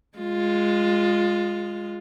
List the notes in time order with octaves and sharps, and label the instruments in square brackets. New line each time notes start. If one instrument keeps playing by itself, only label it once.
[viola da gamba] G#3 F4